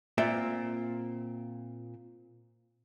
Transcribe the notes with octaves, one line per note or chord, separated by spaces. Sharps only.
A#2 C4 D5 E5